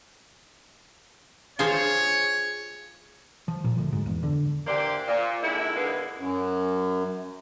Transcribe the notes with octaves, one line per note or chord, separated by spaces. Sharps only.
F4 G#4 C5 C#5
F3
A#2
D2
G#2
E2
D3
E3 A#3 D4 G4 C5 D5
A#2
D3 D#3 G#3 E4
B2 D3 E3 G#3 A#3 B3
F#2